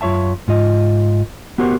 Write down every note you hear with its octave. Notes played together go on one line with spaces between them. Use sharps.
F#2 F4 C#5 E5 A5
G#2 F4 D#5
B3 F#4 G4 A#4 C5